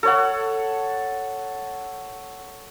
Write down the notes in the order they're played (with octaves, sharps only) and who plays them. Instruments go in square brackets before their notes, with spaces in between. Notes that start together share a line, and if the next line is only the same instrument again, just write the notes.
[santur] A4 C#5 F#5